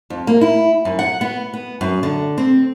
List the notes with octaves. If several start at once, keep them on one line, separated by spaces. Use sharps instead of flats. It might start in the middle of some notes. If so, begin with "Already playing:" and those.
F2
A#3
E4
F#2
F#5
B3
B3
F#2
D3
C4